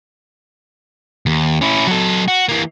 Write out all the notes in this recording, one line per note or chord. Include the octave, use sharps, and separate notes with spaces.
D#2
C#4 E4
F#3 A4
F#4
E3 A#3